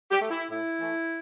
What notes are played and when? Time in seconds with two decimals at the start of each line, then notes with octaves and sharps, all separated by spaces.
0.11 G4
0.21 A3
0.30 E4
0.50 A2 E4
0.79 E3 A3